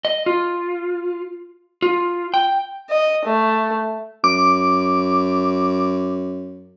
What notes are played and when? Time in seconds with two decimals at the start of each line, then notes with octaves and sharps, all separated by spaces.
0.05 D#5
0.26 F4
1.82 F4
2.34 G5
2.90 D#5
3.25 A3
4.24 F#2 D6